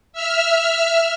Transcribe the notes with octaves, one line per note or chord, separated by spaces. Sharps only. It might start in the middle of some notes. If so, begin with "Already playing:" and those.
E5 E6 F6